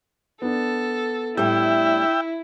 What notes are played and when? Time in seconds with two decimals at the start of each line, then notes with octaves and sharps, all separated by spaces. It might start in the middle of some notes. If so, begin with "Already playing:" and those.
0.42 B3 D4 A4
1.37 A2 G3 E4 E5 G5